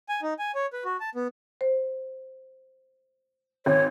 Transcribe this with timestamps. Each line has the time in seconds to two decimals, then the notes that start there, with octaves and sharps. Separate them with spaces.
0.09 G#5
0.22 D#4
0.39 G#5
0.55 C#5
0.73 B4
0.85 F#4
1.00 A5
1.15 B3
1.61 C5
3.66 G#1 C#5